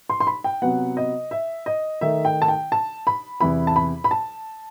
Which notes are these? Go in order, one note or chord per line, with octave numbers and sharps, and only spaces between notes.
C6
C6
B5
G5
C3 F#3 B3 F#5
D#5
E5
D#5
D#3 A3 D#4 E5
G5
A5
G5
A5
B5
E2 C3 E3 B3 E4 B5
A5
B5
B5
A5